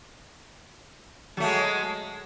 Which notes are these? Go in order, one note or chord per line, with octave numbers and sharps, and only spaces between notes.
F#3 G#3 A3